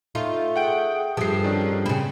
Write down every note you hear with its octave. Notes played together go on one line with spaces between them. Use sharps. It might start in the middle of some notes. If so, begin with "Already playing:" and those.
A3 D#4 F4
G#4 F#5 G5 D7
G2 F3 G4 A4 C7
D#3 C#4 D4
C#3 C4 B5